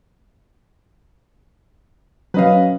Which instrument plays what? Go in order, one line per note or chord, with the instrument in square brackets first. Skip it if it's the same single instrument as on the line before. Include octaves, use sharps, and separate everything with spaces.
[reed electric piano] F#3 C#4 [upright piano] B4 D#5 F5